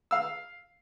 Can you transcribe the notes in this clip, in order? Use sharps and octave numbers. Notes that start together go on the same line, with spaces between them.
F5 E6